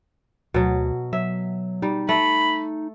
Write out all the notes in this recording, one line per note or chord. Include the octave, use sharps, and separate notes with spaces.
D2 B2 F#3
F#3 E5
G3 D#4
A3 B5